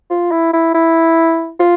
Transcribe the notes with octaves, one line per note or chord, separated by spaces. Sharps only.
F4
E4
E4
E4
F4